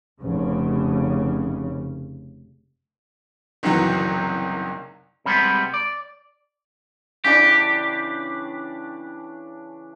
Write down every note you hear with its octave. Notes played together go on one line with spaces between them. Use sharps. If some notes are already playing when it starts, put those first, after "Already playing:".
F1 C#3
F#1 C2 D#3 E3 F#3
C3 G3 G#3 B3
D5
C#3 E3 D4 G4